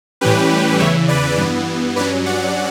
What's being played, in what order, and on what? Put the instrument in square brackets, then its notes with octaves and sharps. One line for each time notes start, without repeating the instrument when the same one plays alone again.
[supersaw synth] A2 E3 G3 C#4 G4 B4
E2 C#3 E3 C#5 E5
B4 D5
G2 E3 B3
G2 F#3 C#4 B4 D5
D5 F#5